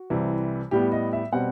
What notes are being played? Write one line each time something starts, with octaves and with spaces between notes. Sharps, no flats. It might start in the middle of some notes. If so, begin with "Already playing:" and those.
Already playing: F#4
C2 C3 E3 G3
A2 G3 B3 G4
D#5
E5
B2 G3 C4 F#5